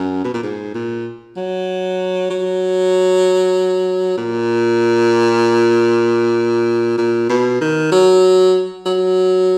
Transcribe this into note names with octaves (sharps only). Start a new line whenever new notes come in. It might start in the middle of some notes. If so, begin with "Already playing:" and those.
Already playing: F#2
B2
A#2
G#2
A#2
F#3
F#3
A#2
A#2
B2
D#3
F#3
F#3